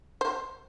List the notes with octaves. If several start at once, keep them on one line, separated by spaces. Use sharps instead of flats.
C5